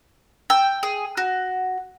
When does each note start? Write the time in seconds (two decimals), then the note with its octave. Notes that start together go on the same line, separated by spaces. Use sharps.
0.50 G5 E6
0.83 G#4
1.17 F#4